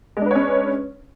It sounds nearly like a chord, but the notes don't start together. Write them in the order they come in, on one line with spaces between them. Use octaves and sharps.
G#3 D4 B4 C#5 C#4